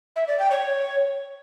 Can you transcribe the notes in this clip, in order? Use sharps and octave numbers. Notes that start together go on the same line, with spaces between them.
E5
D5
G5
C#5